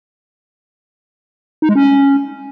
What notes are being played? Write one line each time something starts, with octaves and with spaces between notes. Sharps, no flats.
D#4
G#3
C#4